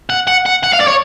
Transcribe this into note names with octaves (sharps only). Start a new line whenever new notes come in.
F#5
F#5
F#5
F#5
F5
D5
C#5